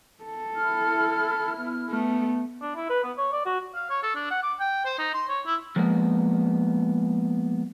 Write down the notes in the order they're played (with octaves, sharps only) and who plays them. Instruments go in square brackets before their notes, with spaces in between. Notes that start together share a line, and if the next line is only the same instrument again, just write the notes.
[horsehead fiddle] A4
[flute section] E4 F6
[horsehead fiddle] B3
A3 B3
[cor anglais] D4
E4
B4
B3
C#5
D5
F#4
[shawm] F5
C#5
A4
D4
F#5
D6
G5
C5
D#4
C6
C#5
E4
[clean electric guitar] F3 G#3 A#3 B3